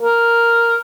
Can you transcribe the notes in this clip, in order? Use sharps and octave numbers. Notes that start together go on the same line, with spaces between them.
A#4